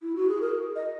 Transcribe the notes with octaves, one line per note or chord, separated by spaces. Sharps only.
E4
F#4
G#4
A#4
D#5